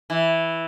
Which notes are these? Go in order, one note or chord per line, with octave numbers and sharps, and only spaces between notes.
E3